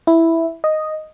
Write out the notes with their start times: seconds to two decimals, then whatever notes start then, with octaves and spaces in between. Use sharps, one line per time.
0.07 E4
0.64 D#5